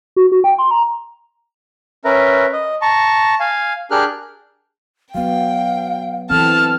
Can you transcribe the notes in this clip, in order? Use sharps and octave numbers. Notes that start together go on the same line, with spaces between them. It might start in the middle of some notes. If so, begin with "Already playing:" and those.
F#4
F#4
G5
C6
A#5
C#4 A#4 B4 E5 A#5
D#5
A5 A#5 C#6
F5 G#5
D4 G4 G#4 A#4 F6 F#6
F#3 B3 F5 G5
E3 C4 A4 A5 F6